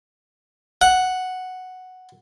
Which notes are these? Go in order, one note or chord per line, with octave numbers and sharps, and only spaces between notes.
F#5